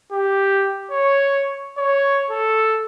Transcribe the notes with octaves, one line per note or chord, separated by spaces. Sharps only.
G4
C#5
C#5
A4